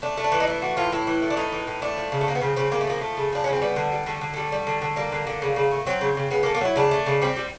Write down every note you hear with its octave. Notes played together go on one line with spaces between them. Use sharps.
A3 D4
A3
D4
E3
D#4
A3 E4
E3 F#4
A2 F4
A2 E4
E3
A3
D4
A2 D#4
E3
A2
A3 D4
F3
C#3
A3
F3 A#3
B3
C#3 C4
C#3 C4
C#3 A#3
A3
F3 A#3
A3
C#3
F3 D4
C#4
C#3
C4
G3 B3
D3
G3
D3 A3
D3
G3 A3
G3
D3
D3
G3 A#3
D3
D3
C#3
C#3
A3
F#3 C4
C#3
C#3
C#3 B3
A#3
A3
A#3
F#3 E4
C#3 D4
A3
C#3
G3 C4
G3